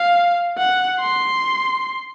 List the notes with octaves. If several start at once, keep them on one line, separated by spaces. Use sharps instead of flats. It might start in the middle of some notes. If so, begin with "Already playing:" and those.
Already playing: F5
F#5
C6